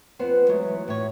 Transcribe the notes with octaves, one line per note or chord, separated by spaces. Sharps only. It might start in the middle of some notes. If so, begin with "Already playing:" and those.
F2 B3 B4 C5 F#5
E3 F#3 G#3 A3
A2 C#5